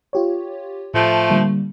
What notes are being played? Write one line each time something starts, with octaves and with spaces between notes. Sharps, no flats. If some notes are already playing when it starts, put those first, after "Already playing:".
F4 G4 C#5
A2 F3 A3
D3 G3 A#3